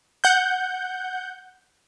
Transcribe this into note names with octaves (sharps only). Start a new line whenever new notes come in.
F#5 G6